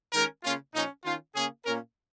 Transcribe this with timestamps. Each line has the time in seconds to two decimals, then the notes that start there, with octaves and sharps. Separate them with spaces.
0.13 D#3 G#3 C#4 A#4
0.43 C#3 A#3 C#4 F4
0.73 A#2 F3 C#4 D#4
1.04 D#3 C#4 F4
1.35 C#3 A#3 C#4 G#4
1.65 A#2 A#3 C#4 A#4